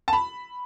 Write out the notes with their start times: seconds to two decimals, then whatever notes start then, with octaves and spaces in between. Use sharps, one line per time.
0.08 A5
0.13 B5